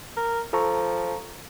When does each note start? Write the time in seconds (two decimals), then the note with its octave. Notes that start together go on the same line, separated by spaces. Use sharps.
0.17 A#4
0.53 F3 A4 A#5 C#6